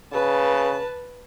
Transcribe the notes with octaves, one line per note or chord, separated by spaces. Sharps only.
C#3 B4 A5